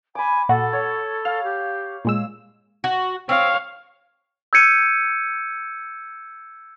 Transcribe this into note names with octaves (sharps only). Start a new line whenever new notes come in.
G#5 B5 D6
A#2 F#4 A4 F#5
C#5
F5 F6
G4
A#2 G#3 E6
F#4
C4 C#5 F5
E6 G6 G#6 C#7 D#7